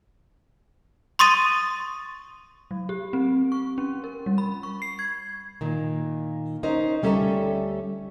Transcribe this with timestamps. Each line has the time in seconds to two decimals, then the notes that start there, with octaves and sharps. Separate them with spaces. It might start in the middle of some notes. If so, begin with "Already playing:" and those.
1.19 C6 C#6 D#6 A6 D#7
2.71 F#3
2.89 G4
3.13 C4
3.52 C#6
3.78 C#4
4.04 A#4
4.26 G3
4.38 B5
4.63 C#6
4.82 C7
4.99 G#6
5.61 A#2 D#3
6.63 C#4 D#4 A#4 C5
7.02 D2 G3 C#4 A4 E5 A#5